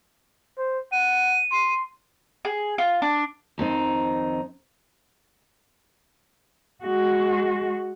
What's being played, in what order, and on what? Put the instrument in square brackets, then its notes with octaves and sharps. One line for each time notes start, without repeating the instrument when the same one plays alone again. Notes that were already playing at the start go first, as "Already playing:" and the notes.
[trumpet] C5
[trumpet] F#5 [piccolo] D#7
[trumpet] C6
[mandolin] G#4
F4
D4
[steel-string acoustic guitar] F2 D#3 C4 D#4
[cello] G#3 F#4